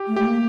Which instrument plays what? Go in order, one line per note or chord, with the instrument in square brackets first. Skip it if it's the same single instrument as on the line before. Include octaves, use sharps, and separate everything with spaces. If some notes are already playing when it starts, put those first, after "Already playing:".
Already playing: [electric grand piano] G4
[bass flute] A3
[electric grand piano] G4
[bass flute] A#3